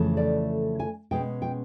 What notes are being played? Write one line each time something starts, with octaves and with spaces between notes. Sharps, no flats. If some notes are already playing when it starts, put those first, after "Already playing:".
Already playing: F2 C#3 E3 A3
D5
G#5
B2 G#3 C#4 G5
G5